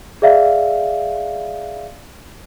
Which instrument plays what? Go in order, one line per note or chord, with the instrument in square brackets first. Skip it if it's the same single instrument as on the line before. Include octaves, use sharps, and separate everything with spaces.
[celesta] G#4 D5 E5 F5